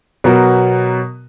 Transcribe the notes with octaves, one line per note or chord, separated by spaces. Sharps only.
B2 F#3 B3 F#4 A#4